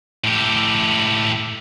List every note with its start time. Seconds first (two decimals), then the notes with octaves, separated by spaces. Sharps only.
0.24 A2 G4